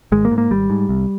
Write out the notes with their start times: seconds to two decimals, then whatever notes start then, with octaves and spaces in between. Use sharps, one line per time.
0.12 G#1 G#3
0.25 A#3
0.31 G#2
0.38 A#3
0.50 G#1 G3
0.70 G#2
0.89 C2